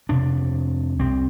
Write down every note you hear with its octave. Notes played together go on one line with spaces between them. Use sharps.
F2 C3 D4
C2 C3 C4